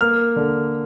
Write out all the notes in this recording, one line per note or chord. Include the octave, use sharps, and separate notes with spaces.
A#3 F6
D3